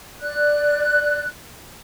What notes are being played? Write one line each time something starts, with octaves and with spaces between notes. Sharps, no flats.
D5 F#6